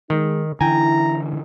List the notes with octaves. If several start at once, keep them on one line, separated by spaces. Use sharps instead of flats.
D#3 G#3 D#4
D3 E3 E4 G5 G#5 A#5